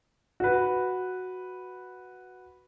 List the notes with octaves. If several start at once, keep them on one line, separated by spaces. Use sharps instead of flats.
F#4 B4